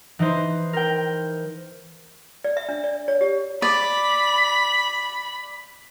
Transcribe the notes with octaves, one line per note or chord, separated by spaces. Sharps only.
E3 D#4 B4 C5
A#4 G5
D5
E5
D4
D5
C#5
G4
D5 B5